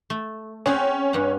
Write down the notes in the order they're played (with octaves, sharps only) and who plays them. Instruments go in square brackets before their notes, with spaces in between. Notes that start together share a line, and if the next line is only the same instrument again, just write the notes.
[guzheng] A3
[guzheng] C4 G#4 F#5 [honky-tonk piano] C#4
[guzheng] G2 F#5